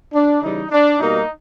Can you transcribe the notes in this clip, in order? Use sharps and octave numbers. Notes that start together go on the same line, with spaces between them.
D4
C#3 E3 G3 D#4
D4
B2 G3 A#3 D#4